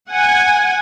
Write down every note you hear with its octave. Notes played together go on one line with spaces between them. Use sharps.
F#5 G#5